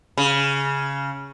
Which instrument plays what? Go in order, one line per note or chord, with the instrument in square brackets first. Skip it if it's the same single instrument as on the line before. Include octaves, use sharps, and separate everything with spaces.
[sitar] C#3